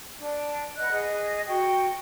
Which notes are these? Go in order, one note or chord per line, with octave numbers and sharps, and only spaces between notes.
D4
B4 D#5 F#5 F#6
G#4 D#5
F#4 G5